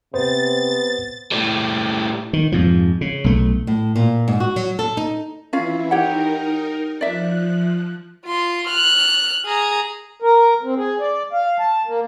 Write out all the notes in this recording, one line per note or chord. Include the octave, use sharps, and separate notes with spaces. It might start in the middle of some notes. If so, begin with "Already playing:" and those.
C3 B3 C5 A6
A2 G3
D#3
F2 G#2 F3
C#3
B1 A3
A2
A#2
G#2
F#4
F#3
A4
D#4
E3 C#4 E4 F4 F5
D#4 G4 A#4 C#5 F#5
F3 D5 E5 F#6
F4 C6
F6 F#6
G#4 A#5
A#4
C4
G#4
D5
F5
A5
A#3